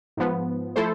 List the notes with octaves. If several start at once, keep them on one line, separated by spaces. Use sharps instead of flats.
G#2 F3 B3
F3 A3 E4 A4 C5